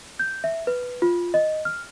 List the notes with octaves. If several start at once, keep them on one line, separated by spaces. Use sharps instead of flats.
G6
E5
B4
F4
D#5
F6